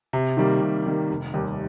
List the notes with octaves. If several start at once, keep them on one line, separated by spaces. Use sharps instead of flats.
C3
D#3 G3 A#3
C3
D#3 G3 A#3
F1
D#2 D#3 G3